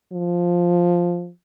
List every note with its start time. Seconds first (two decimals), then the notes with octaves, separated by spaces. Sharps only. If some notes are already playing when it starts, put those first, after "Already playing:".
0.13 F3